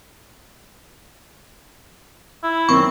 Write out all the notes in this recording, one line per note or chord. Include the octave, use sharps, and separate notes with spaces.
E4
F#2 D#3 C4 C#6